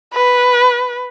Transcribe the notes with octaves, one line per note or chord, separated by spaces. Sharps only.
B4